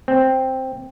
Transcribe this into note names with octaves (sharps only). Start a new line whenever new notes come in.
C4